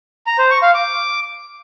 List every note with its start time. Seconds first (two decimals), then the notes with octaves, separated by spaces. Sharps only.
0.27 A#5
0.39 C5
0.51 C#6
0.63 F5
0.74 D6